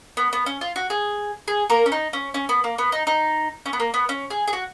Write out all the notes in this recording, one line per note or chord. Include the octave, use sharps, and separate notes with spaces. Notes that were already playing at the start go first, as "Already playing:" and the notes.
B3
B3
C#4
F4
F#4
G#4
G#4
A#3 A#4
C#4
D#4
C#4
C#4
B3
A#3
B3
D#4
D#4
C#4
B3
A#3
B3
C#4
G#4
G#4
F#4